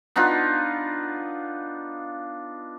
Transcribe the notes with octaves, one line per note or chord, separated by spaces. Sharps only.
B3 D4 D#4 F4